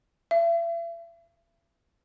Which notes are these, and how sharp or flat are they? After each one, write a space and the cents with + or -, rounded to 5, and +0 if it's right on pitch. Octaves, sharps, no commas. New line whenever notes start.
E5 +40